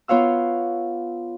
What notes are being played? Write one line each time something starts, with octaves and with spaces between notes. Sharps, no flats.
B3 F4 C#5 F5 E6